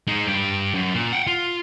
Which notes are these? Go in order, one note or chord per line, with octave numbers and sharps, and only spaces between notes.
G#3 D#4
G2 G4
F#2
A#2
F#5 G5
F4